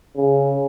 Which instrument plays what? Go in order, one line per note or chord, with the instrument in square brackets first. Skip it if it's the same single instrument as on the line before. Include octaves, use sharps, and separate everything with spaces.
[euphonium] C#3